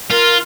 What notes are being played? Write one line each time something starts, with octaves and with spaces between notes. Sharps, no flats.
F4 A#4